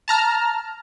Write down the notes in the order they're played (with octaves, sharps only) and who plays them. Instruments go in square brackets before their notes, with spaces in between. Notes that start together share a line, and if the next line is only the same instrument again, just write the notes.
[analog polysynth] A5 A#5 F6